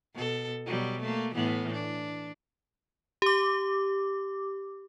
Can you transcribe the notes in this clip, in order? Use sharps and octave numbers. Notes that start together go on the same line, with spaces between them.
B2 A4
B2 F#3 G3
A3 A#3
A2 E3 B3
D4
G4 D6